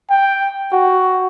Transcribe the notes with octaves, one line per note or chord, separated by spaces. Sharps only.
G5
F#4